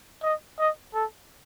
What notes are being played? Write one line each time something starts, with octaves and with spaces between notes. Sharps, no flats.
D#5
D#5
A4